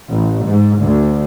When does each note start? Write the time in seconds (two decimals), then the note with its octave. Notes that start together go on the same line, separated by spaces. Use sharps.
0.14 A1
0.46 G#2
0.82 D2